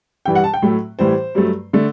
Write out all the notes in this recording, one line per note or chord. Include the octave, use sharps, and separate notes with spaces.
G2 E3 G3 G5
F#5
A5
G5
A2 F#3 A3
A2 E3 G3 C5
G2 F#3 A3
D3 A3